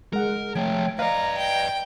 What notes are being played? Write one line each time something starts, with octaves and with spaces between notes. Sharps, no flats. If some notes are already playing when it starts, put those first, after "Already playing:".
G#3 A#4 F#5
F3 A3 C#5 G5
B4 D5 D#5 F5 A#5
G5